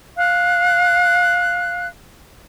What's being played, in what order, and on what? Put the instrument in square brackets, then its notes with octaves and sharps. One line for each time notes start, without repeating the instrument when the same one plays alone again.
[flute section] F5 F#6